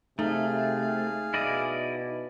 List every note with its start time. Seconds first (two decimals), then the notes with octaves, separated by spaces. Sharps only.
0.19 C3 A3 D#4 G#4 F5
1.34 B2 E4 D5 D#5